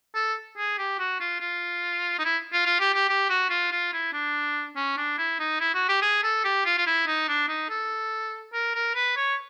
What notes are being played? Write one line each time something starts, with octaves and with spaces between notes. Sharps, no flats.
A4
G#4
G4
F#4
F4
F4
D#4
E4
F4
F4
G4
G4
G4
F#4
F4
F4
E4
D4
C#4
D4
E4
D#4
E4
F#4
G4
G#4
A4
G4
F4
F4
E4
D#4
D4
D#4
A4
A#4
A#4
B4
C#5